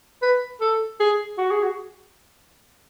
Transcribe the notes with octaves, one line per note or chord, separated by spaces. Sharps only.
B4
A4
G#4
F#4
G#4
F#4